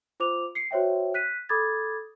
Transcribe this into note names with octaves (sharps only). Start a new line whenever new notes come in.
F4 C5 D6 F7
C7 C#7
F#4 C5 C#5 E5 G5
F#6 B6 D#7
A4 B5 D6 D#6 G#6 A6